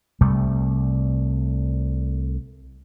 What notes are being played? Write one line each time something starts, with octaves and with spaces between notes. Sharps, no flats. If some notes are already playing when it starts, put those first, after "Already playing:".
C2 C3 G3 A3